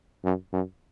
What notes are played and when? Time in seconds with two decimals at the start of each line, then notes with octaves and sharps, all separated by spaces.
0.24 F#2
0.53 F#2